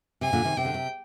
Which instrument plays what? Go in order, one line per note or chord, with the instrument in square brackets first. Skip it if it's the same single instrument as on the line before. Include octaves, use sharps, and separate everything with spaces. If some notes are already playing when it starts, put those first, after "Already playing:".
[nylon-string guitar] C3 [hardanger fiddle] G#5
[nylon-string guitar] A#2 D3
C3 D#3
[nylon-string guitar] C3 [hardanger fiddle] G5
[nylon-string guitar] D3
C3